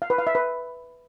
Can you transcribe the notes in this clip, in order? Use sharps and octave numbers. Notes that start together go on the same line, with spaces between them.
F5
B4
F5
E5
B4